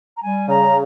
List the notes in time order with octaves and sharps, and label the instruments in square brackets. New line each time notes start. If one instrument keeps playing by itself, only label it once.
[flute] A#5
[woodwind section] G3 [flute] G#5
[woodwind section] C#3 [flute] A#5